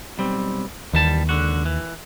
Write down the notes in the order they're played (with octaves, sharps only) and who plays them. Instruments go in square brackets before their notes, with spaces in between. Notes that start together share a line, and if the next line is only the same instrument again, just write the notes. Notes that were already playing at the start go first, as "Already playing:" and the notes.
[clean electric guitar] B1 G3 C4
[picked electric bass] D#2 [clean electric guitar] E3 G3 A5
[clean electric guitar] C#2 D3 F#4
E3